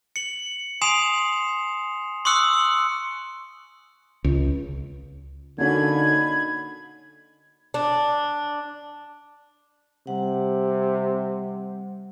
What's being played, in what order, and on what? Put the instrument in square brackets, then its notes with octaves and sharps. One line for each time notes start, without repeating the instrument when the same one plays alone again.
[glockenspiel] C#7 F#7
G#5 C6 D#6 C7 E7 F7
C6 C#6 D#6 E6 F#6 C#7
[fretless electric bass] C#2
[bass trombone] D3 [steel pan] A#3 C#4 F#4 [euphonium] D#4 [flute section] B5 G#6
[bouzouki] D4
[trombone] C3 [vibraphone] G3 F#5